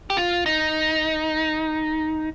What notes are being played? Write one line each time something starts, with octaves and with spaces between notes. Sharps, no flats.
G4
F4
D#4